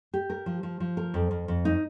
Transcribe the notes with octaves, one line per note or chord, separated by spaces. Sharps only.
G4
A#4
F3
F3
F3
A#4
F2
F2
F2
D#4